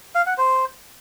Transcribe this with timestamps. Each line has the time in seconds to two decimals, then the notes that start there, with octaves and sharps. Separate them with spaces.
0.15 F5
0.26 F#5
0.38 C5